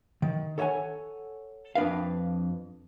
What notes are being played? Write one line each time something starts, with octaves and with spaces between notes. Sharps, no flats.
D#3
A4 C#5 D#5 F#5 G#5
F2 D4 B4 F5